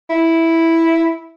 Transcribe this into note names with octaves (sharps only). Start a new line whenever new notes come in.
E4